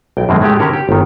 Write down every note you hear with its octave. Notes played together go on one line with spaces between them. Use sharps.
B1 G5
F#2 B2 D3 D#3 G#3 C4
A2 G#3 A3 G4
D3 D#3 C#4 G4 A#4 C5
G4
G1 D#3